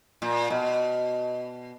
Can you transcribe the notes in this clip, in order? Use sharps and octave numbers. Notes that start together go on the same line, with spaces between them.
A#2
B2